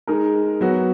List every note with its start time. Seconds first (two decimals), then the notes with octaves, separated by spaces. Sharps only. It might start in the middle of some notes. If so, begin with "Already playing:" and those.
0.07 G#3 D#4 A#4
0.61 F#3 B3 F#4